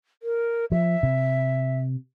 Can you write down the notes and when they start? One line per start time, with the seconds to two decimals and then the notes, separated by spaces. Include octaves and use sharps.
0.23 A#4
0.72 F3 E5
1.03 C3